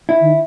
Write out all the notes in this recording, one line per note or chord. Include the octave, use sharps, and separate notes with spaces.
E4
D#3